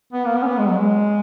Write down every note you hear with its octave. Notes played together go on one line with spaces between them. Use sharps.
B3
A#3
B3
C#4
B3
G#3
F#3
G#3